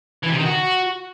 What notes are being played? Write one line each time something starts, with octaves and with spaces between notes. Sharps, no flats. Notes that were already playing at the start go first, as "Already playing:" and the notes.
E3
C3
D#3
F#4